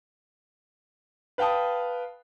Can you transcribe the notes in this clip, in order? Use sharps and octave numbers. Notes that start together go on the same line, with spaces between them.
B4 F5 G5 A5 D#6